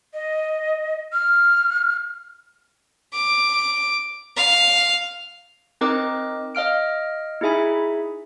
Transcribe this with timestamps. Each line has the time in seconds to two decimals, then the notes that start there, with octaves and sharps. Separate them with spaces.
0.14 D#5
1.12 F6
3.14 D6
4.37 F5
5.81 C4 D#4 A#4 D#5 D6 F#6
6.55 D#5 F5 F6 D7
7.41 D#4 E4 G#4 E5 G#5 B5